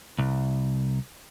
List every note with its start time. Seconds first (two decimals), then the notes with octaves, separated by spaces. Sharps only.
0.18 C2